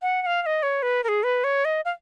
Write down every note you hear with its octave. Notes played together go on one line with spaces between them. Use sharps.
F#5
F#5
F5
F5
D#5
C#5
B4
A#4
G#4
B4
C#5
D#5
F5